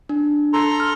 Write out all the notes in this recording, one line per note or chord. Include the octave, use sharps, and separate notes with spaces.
D4
A4 A#5 C6
F6